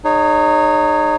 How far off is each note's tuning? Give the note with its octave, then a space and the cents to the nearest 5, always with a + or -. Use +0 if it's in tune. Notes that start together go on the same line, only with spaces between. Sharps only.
D#4 -25 G#4 +0 C#5 +0